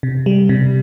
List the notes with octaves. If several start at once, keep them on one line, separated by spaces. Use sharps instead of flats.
C3
G3
C3